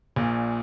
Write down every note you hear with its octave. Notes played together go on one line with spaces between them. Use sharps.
A#1 A#2